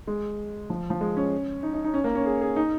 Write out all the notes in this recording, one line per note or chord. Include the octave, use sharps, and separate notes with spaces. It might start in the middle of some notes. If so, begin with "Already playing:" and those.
G#3
F3
F3
G#3
C#4
D#4
D#4
D#4
C#4
A#3
C#4
G#4
G#4
D#4